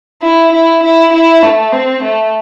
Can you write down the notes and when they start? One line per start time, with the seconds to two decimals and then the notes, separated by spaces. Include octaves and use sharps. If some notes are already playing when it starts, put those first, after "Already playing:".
0.22 E4
0.52 E4
0.83 E4
1.13 E4
1.43 A3
1.72 C4
2.03 A3